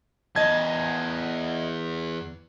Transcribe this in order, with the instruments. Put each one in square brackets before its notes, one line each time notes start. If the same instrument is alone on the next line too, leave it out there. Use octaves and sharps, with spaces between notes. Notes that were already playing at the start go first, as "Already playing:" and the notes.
[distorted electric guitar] E2 A5 [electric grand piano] D#5 G#6